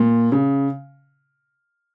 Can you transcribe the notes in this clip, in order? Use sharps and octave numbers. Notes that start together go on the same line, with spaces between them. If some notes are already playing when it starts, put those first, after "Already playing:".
Already playing: A#2
C#3